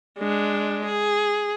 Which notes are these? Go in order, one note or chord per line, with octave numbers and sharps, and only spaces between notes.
G#3 D4
G#4